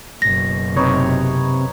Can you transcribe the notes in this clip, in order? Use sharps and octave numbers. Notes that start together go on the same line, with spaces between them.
F#1 B2 A#6
C3 D#4 B4 C#5